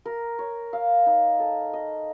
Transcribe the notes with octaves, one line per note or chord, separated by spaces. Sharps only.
A#4
C#5
F5
D#4
A4
D#5